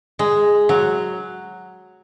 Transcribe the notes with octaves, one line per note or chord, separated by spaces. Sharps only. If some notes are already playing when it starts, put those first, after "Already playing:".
G#3
F#3